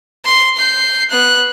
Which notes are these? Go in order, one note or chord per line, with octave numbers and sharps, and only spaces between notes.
C6
G6 C7
B3 F#6